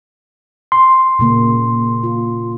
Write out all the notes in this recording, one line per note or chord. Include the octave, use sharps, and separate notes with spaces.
C6
A#2 C#3 A#3
F4